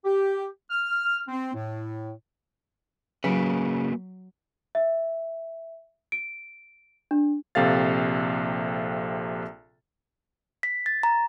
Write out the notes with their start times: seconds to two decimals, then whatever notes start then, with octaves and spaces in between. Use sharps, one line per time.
0.04 G4
0.71 F6
1.28 C4
1.53 A2
3.24 C#3 F#3 A#3 F#4 B4 B6 D7
4.75 E5
6.12 D7
7.11 D4
7.55 A#1 C3 A4 F5 A6
10.63 B6
10.86 A6
11.03 A#5